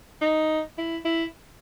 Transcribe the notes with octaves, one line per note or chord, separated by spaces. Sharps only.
D#4
E4
E4